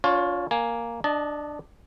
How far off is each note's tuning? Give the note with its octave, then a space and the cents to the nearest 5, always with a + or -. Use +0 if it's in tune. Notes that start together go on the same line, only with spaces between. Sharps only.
D4 -40 F4 +15 C#5 +0
A#3 +0 G#5 +0
D4 +10 D#5 +0 A5 -20